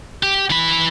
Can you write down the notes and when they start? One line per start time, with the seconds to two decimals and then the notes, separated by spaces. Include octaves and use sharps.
0.23 G4
0.50 E3 B5